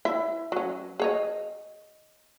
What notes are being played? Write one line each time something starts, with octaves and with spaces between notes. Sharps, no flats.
E4 E5
F#3 C#4
G#4 C#5 D#5